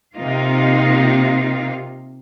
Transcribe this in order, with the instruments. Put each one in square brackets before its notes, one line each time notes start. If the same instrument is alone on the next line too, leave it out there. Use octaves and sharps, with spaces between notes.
[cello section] C3 A#3 D#4 F4 F5